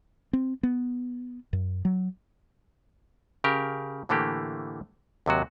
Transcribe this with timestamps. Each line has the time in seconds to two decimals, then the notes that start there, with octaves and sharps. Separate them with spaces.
0.33 C4
0.63 B3
1.53 F#2
1.85 F#3
3.44 C#3 G4 A#4
4.09 A2 D3 E3 A3 A#3 G4
5.26 D#2 C3 F#3 F#4